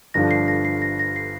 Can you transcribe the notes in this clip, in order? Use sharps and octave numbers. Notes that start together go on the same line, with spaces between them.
G1 G2 D3 F3 D4 A#6
C7
A#6
C7
A#6
A#6
C7